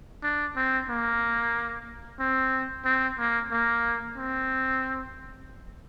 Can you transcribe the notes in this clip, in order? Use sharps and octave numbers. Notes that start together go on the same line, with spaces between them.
D4
C4
A#3
C4
C4
A#3
A#3
C4